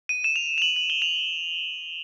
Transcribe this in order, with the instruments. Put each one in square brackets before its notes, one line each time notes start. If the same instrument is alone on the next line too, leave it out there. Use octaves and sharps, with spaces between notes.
[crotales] D#7
E7
F7
F7
F#7
F#7
G7
F7